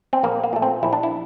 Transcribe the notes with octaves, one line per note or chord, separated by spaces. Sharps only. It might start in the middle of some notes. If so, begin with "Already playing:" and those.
C4
A#1 A#3
A#3
A#2 A3
C4
A#1 E4
D4
E4